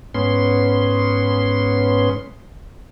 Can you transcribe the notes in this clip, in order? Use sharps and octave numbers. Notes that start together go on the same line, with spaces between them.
G#2 B3 C#4 C6